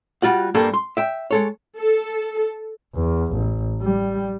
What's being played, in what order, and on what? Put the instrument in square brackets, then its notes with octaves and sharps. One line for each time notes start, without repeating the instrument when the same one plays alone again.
[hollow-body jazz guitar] G3 F4 F#4 F#5
G2 G3 A#3 A4
C6
E5 G5
G#3 A4 C#5
[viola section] A4
[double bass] E2
A1
G3